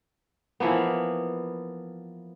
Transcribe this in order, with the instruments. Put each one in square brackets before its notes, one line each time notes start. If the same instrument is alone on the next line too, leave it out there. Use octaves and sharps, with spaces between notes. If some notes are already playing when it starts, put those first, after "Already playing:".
[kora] E3 F3 A#3 B3